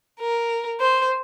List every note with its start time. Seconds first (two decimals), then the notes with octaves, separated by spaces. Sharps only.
0.20 A#4
0.80 C5